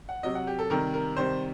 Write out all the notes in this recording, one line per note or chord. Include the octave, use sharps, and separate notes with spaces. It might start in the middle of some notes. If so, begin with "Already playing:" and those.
F#5
C3 F#3 D#5
F#5
G4
A4
C3 D#3 G3 A#4
A#4
C3 D#3 G3 C5